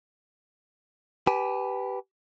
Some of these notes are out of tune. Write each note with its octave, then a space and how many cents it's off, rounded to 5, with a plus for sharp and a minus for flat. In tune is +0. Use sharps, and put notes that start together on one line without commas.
G4 -10 B4 +0 G#5 +35